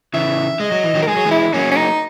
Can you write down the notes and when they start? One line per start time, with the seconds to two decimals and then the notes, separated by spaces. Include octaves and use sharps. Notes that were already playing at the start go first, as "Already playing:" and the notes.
0.14 C#3 E3 E5
0.60 G#3 D#5
0.72 F#3
0.83 E3
0.95 D#3 F#3
1.02 A#4
1.08 G#3 G#4
1.16 F#3
1.26 E3 G#3 E4
1.53 F#3 A#3 C#4
1.71 C#4
1.77 D#4